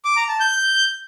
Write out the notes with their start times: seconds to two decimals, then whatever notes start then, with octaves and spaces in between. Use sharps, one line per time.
0.05 D6
0.16 A#5
0.28 A5
0.40 G6